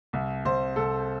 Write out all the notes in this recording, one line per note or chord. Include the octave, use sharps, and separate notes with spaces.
C2
C2 C5
C2 A4